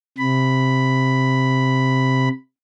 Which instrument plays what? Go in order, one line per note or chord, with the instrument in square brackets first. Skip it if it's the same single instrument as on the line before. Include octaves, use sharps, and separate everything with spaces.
[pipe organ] C3 B5